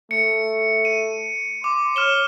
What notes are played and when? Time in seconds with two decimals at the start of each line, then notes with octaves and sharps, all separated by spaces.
0.11 A3 C#7
0.85 D#7
1.64 C6 D6
1.96 C#5 F6 E7 G7